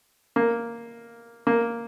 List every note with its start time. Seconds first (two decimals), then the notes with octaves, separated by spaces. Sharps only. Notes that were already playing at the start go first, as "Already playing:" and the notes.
0.36 A#3
1.47 A#3